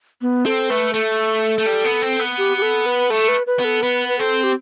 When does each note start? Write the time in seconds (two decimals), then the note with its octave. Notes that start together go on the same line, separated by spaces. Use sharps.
0.22 B3
0.45 C4 A4
0.70 A3 B4
0.93 A3 A4
1.58 A3
1.66 G3
1.84 B3
2.02 C4
2.19 B3
2.38 G4
2.58 G4
2.62 A4
2.86 B4
3.10 A3 A4
3.28 B4
3.47 B4
3.59 B3
3.65 A4
3.82 B3 B4
4.08 B4
4.19 C4 A4
4.43 G4